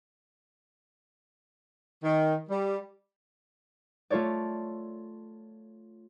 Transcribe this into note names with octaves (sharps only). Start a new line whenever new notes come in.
D#3
G3
A3 F4 A4 C#5 D5